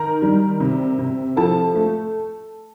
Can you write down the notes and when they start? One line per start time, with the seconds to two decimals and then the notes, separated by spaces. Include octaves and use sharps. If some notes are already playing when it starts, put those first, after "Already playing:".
Already playing: D#3 A#4 A#5
0.22 G3
0.60 C3
0.99 C3
1.37 F3 A4 A5
1.76 A3